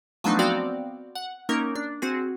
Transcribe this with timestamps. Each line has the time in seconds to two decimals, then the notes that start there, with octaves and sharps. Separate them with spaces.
0.24 F3 F#3 A3 B3 D4 D#4
0.39 B3 C4 F#4 D5 F5 G5
1.15 F#5
1.49 A#3 C#4 D#4 A#4
1.75 D4
2.02 C4 F#4 G#4